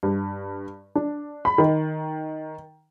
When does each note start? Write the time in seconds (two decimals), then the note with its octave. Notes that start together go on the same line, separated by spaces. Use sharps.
0.03 G2
0.95 D4
1.45 B5
1.58 D#3